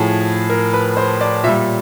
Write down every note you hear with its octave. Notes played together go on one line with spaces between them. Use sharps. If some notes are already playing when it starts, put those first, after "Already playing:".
Already playing: A2 F3 G#4
A#4
B4
C5
D5
A#2 E5
G3